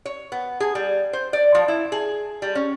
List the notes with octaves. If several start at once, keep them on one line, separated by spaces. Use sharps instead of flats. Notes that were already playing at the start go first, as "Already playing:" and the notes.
C#5
B3
G#4
G3
C5
D5
F3
E4
G#4
G3
C#4